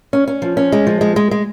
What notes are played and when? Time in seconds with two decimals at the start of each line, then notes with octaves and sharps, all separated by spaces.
0.13 C#4
0.28 C#4
0.42 F3
0.57 C#4
0.72 G#3
0.87 F3
1.01 G#3
1.16 G#3
1.31 G#3